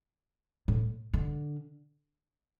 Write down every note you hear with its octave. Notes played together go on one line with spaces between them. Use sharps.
A2
D3